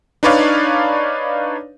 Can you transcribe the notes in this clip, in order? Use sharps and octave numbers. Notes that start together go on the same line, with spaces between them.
D4 D#4 B4 C#5 D5 F5